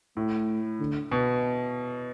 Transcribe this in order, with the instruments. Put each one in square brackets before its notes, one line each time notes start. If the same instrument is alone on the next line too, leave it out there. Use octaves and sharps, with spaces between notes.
[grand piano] A2 [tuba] A3
[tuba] D3
[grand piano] B2